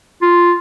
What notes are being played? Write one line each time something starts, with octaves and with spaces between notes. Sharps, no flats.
F4